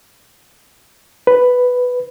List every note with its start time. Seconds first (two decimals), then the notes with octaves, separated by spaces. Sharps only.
1.27 B4